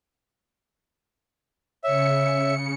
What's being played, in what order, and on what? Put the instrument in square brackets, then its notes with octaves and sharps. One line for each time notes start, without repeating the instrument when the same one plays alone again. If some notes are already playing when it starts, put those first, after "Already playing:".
[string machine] C#3 C#7 [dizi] C#5 [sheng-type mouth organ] E5